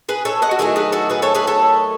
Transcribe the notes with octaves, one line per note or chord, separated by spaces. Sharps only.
G#4 B4
A4 C#5
D#5 F#5
F#4
D#3 F#3 A3 E4 G#4
G#4 B4
F#4 A4
G#4 B4
A4 C#5
G#4 B4
A4 C#5